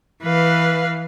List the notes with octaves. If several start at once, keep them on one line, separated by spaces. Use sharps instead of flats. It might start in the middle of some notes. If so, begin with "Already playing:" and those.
E3 B4 F5